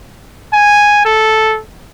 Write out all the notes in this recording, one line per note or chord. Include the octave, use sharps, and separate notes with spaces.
G#5
A4